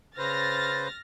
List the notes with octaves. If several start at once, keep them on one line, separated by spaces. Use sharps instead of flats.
C#3 B4 C5 F6 A6 A#6